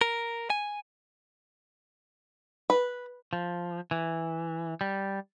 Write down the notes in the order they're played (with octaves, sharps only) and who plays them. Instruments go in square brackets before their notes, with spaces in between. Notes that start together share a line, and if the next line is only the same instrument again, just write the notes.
[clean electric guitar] A#4
G#5
[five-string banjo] B4
[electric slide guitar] F3
E3
G3